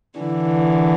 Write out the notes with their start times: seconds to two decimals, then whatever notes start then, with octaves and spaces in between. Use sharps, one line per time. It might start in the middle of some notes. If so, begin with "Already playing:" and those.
0.19 D3 E3